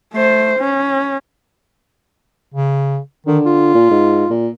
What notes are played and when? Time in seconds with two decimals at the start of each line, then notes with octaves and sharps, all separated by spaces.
0.13 A3 C5
0.59 C#4
2.54 C#3
3.27 D3 D#3
3.46 F4
3.75 A#2
3.91 G#2
4.30 A#2